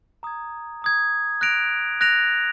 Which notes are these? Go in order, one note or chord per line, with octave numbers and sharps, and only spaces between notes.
A#5 D#6 G#6
A#5 D#6 G#6
F#6 A#6 D7 F7
F#6 A#6 D7 F7